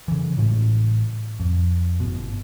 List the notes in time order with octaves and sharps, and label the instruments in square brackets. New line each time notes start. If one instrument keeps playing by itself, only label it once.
[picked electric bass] C#3 E3
A1 A2 C#3 G#3
F2
G1 B2